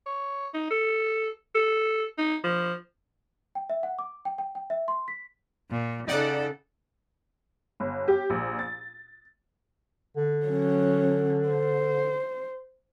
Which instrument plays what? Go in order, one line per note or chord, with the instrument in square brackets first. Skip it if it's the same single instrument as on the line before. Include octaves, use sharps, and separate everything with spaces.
[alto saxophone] C#5
D#4
A4
A4
D#4
F3
[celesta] G5
E5
F#5
D6
G5
G5
G5
E5
C6
B6
[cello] A#2
[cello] C#3 A4 [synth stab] D#4 D5 F#5
[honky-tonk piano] G1
G4
A#1
A6
[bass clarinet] D3
[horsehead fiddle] F#3 C#4
C5